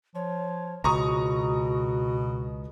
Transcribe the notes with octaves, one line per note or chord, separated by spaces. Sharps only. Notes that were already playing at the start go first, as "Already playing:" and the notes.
F3 C#5
C#2 B2 F#4 A#5 C#6 D#6